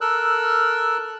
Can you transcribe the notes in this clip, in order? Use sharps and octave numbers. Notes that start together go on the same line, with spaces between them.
A4 A#4 E6 F#6